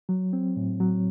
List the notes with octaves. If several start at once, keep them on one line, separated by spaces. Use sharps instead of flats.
F#3
C4
A2
F#3